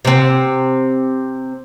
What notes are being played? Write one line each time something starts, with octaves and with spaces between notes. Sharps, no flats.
C3 C4